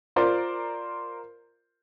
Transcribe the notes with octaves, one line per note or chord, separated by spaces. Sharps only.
F4 A#4 C5 D5